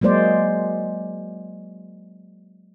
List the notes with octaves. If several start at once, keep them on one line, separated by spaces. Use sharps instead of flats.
F#3 G#3 A#3 C5 D5